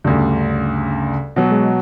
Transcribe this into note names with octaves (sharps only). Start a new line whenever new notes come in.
D2 G2 C#3
B2 F#3
G#3